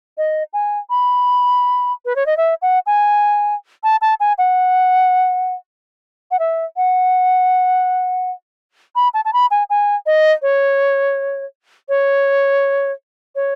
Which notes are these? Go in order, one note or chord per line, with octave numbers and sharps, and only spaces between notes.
D#5
G#5
B5
B4
C#5
D#5
E5
F#5
G#5
A5
A5
G#5
F#5
F#5
E5
F#5
B5
A5
A5
B5
G#5
G#5
D#5
C#5
C#5
C#5